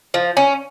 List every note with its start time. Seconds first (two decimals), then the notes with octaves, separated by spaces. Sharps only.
0.14 F3
0.37 C#4